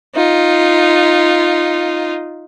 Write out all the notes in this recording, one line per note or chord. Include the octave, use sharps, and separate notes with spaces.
D#4 F4